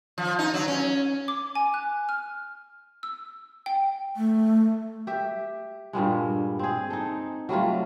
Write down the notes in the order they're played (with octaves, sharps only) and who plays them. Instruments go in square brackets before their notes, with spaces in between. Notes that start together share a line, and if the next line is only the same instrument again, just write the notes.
[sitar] F3
D#4
F#3
C#4
[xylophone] D6
G#5
F#6
F6
E6
G5
[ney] A3
[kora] G4 E5
G2 A#2 G3 G#3
C4 G#4
D#4 A4
F#3 G3 A3 F4